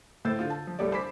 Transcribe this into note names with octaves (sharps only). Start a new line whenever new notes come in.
A2 C5 E6 G6 A6
D3 F4
A5
F3
C2 G3 A3 G4 C#5 D5
C5 G#5 B5 D6 B6